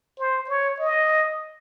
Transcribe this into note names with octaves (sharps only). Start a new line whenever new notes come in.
C5
C#5
D#5